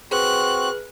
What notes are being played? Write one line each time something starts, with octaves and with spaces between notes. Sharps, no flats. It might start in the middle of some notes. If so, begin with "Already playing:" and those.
C4 F#4 G#4 B4 F#6